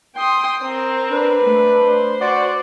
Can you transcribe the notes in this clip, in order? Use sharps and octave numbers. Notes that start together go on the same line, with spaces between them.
G5 C6 D#6
C4 A#4
D4 B4
A3
C5
F#4 D5